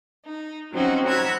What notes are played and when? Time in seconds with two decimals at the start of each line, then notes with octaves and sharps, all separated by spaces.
0.24 D#4
0.73 F3 F#3 C4 C#4 D#4 F#4
1.06 F#5 A#5 B5 E6 F#6 G#6